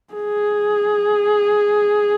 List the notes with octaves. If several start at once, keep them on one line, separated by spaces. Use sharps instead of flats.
G#4